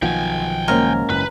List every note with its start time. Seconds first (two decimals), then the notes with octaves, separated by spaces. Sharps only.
0.02 B1 D#3 F3 B3 G5 G#5
0.68 G#2 F#3 A#3 C#4 F4 A#4
1.10 F#1 B4